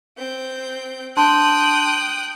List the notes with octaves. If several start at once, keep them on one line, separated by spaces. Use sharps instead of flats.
C4 G6
D4 G5 A5 C6 D#6 F#6